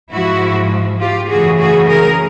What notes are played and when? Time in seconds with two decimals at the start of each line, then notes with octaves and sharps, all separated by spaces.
0.11 G#2 F3 G#3 E4 F#4
0.99 F4 G4
1.28 F#2 C#3 E3 A3 F#4 G#4
1.58 F#4 G#4
1.87 G#4 A#4